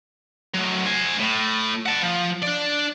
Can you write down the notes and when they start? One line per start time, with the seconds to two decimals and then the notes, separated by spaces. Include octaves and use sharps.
0.54 A2 F#3
0.86 C5 G#5
1.19 A2
1.86 F#5 A5
2.03 F3
2.43 D4 D5